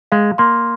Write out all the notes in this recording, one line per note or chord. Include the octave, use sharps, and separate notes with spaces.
G#3 F5
A#3 C6